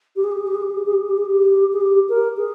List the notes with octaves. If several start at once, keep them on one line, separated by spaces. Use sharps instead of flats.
G4
G#4
G4
G#4
G4
G#4
G4
G#4
G4
G#4
G4
G#4
G4
G#4
G4
G#4
G4
A#4
G#4